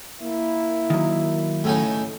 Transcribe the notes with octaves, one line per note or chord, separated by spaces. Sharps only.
A#3 E4
D#3 F#3
A2 C#3 D#4